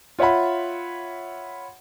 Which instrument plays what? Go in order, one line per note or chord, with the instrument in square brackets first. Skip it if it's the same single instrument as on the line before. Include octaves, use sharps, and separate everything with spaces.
[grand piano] F4 C#5 E5 F#5 B5